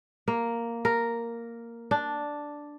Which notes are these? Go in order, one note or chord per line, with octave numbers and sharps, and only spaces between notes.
A#3
A#4
D4